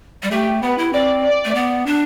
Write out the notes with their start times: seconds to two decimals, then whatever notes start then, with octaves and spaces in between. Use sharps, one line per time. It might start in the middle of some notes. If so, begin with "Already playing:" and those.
0.23 G3
0.31 A3 G4
0.62 B3 B4
0.78 E4
0.93 C4 D5
1.24 D5
1.45 A3
1.55 B3
1.86 D4